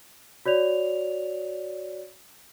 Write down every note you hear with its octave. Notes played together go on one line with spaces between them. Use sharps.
F#4 C#5 D5 F7